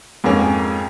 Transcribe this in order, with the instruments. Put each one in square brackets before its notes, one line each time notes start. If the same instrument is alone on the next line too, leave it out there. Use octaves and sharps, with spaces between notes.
[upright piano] F2 G#2 G#3 A#3 C#4